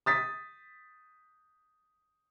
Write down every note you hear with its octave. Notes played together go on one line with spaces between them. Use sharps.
D#6 A6 B6